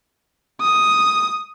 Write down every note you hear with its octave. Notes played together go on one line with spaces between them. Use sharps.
D#6